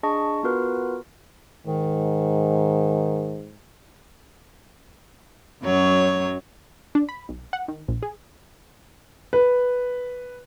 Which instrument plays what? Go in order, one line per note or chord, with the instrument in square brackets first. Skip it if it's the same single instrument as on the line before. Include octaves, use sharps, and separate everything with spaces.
[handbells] D4 G#4 D#5 A5 C#6
B3 F4 F#4 A#4 B4
[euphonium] G#2 [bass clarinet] D#3
[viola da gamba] F#2 F#3 C#5
[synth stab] D4
B5
B1
F#5
D#3
A#1
G#4
[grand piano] B4